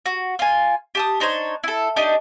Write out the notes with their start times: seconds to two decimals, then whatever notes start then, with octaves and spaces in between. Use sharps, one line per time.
0.06 F#4
0.39 F4 G#5
0.95 G4 A5 D#6
1.20 D4 D#4 C5 C#5
1.64 E4 A4
1.96 D4 D#4 G4 D#5